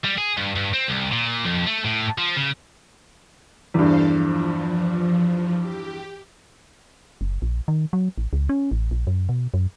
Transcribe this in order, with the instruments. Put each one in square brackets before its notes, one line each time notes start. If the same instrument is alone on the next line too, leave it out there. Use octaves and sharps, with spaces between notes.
[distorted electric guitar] G3
G#4
G2
G2
C4
C2
A#2
F2
A3
A2
F3
C#3
[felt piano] E2 G2 [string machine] A4 C5 F5
[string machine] F3
G4
[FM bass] F#1
A#1
D#3
F#3
A1
C#2
C#4
A1
A#1
F#2
B2
F#2